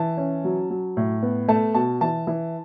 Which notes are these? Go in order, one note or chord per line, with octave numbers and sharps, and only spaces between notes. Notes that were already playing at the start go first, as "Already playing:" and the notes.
Already playing: E3 A5
C#4
F#3
F#3
A2
B3
A3 A5
B2 A5
E3 A5
E3